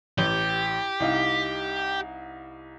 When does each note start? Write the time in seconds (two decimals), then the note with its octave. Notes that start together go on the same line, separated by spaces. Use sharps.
0.18 A1 G4
1.00 C2 D#4 F5